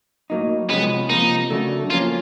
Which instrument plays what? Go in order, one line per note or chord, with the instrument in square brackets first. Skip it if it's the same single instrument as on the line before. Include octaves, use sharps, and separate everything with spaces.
[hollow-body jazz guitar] A2 F#3 A#3 D#4
[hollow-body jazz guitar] C3 F3 G#3 C#4 [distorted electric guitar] B3
[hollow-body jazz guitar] C3 F3 A#3 [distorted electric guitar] D#4
[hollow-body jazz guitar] C#3 F#3 A3 D4
[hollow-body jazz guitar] F3 A#3 C#4 [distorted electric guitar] F4